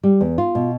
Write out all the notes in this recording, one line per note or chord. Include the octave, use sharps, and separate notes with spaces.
G3
E2
F4
B2